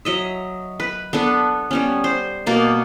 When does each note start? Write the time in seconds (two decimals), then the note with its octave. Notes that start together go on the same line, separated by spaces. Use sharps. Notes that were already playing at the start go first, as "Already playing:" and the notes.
0.05 F#3 D#5 E5
0.80 B4
1.13 B3 D4 A4 B4
1.71 G3 B3 C#4
2.04 C5
2.46 B2 A#3 D5